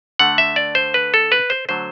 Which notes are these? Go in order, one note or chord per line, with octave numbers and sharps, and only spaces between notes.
D3 A3 F#5
E5
D5
C5
B4
A4
B4
C5
D3 F#3 A3 C5